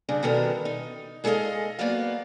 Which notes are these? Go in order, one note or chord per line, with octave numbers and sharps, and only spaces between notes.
G2 C#3 D4
B2 D#3 G3 B3 A4 A#4
D#4
G#3 G#4 A4 B4 D#5 F5
F#3 A#3 B3 B4 D5 F5